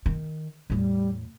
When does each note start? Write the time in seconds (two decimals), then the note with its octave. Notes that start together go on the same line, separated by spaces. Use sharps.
0.06 D#3
0.70 E2 A2 G3